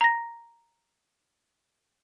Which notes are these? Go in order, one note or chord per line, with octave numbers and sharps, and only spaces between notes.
A#5 A#6